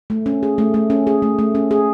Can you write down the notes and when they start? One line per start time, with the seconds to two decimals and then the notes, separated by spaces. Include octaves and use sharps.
0.10 A3
0.26 C#4
0.43 G#4
0.58 A3
0.74 A3
0.90 C#4
1.07 G#4
1.22 A3
1.39 A3
1.55 C#4
1.71 G#4